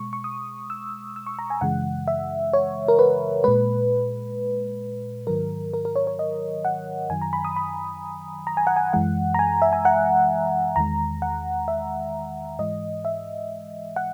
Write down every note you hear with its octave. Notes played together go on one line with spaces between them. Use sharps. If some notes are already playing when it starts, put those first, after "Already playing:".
Already playing: B2 G#3 C#6
C#6
D#6
E6
E6
C#6
A#5
G#5
F#2 C#3 E3 G#3 F#5
E5
C#5
A#4
B4
A#2 G#3 B4
G#2 D#3 F#3 A#4
A#4
A#4
C#5
C#5
D#5
F#5
F#2 D#3 F#3 G#5
A#5
B5
D#6
B5
A#5
G#5
F#5
G#5
F#2 E3 G#3 F#5
A#5
G#5
E5
G#5
F#5
E2 D#3 G#3 A#5
F#5
E5
G#2 E3 G#3 D#5
E5
F#5